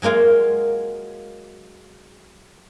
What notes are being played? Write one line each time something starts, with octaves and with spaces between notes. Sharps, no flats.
F#3 G#3 A#3 F4 G#4